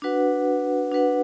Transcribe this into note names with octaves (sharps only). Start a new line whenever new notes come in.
D4 F#4 B4 F#5
D4 F#4 B4 F#5